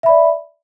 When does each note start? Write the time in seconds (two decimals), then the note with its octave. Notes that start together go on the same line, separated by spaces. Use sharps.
0.03 E5
0.06 B5
0.09 D5